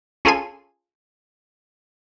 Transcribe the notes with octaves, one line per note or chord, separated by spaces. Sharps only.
C#4 F4 G#4 A4 F5 G#5